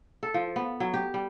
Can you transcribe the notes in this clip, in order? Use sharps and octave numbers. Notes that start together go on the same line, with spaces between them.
A4
F3
B3
F#3
G4
G3